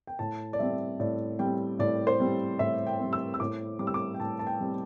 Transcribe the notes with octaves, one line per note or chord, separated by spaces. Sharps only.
G5
A2 A5
D5
G3 C4 E5
A2 D5
G3 C4 G5
A2 D5
C5
G3 C4
A2 E5
G5
G3 C4
E6
E6
A2 D6
G3 C4 D6
E6
D6
G5
A2 A5
A5
G5
G3 C4